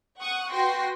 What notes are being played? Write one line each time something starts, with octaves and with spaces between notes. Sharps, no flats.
F#5 C#6 D#6
F#4 B4 G5 C6 A#6 C7